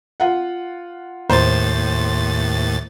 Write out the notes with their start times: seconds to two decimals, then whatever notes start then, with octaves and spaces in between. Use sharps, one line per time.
0.20 F4 F#5
1.30 D#2 A2 C5 A6